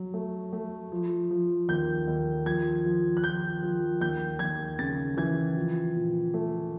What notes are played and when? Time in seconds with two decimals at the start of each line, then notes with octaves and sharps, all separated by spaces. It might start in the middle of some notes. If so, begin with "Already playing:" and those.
Already playing: F#3
0.14 A3
0.53 A3
0.92 F3
1.31 F3
1.69 D#2 G6
2.07 D#2
2.46 F3 G#6
2.84 F3
3.17 F#6
3.23 F3 G6
3.63 F3
4.01 D#2 G6
4.39 D#2 G#6
4.79 C#3 A6
5.17 E3 G#6
5.56 F3
5.95 A#2
6.34 A3